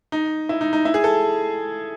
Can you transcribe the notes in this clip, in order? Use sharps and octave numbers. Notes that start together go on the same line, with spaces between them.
D#4
E4
D#4
D#4
E4
G#4
A4